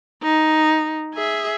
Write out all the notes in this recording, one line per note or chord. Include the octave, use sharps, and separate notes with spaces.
D#4
G#4 E5